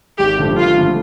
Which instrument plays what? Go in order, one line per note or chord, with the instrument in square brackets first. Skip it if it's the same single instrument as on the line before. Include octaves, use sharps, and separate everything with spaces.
[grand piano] G#1 [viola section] G4
[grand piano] G2 D3 F3 A3
[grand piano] G#1 [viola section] F4
[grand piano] G2 D3 F3 A3